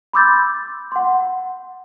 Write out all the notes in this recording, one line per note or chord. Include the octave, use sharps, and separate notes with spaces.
B5 C6 D6 E6 G6 A6
F#5 C6